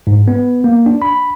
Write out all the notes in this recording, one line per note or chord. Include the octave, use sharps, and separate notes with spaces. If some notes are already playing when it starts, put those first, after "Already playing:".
G#2
B3
A#3
D4
B5